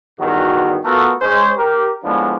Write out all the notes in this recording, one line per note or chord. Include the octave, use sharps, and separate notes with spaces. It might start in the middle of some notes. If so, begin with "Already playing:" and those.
E2 G2 D#3 F#4
A3 B3 F4 F#4 A4 A#4
G#3 C#4 C5
G4 A#4
A2 F3 G#3 B3 D4